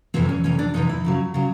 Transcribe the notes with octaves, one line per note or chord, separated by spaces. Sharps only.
F2 C3 E3 C4
C#4
F2 C3 E3 C#4
D4
F2 C3 E3 D#4
E4
F#2 C#3 F#3
C#3 F#3